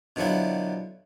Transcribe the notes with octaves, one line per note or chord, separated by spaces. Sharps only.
B2 D3 F3 F#3 E4